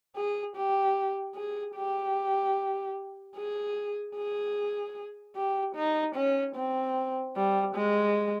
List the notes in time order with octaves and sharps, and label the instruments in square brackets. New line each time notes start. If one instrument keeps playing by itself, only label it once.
[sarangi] G#4
G4
G#4
G4
G#4
G#4
G4
D#4
C#4
C4
G3
G#3